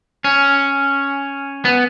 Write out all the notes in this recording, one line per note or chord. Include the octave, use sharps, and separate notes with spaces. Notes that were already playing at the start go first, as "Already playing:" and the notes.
C#4
B3